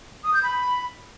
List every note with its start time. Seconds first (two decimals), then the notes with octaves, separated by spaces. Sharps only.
0.24 D#6
0.34 G6
0.43 B5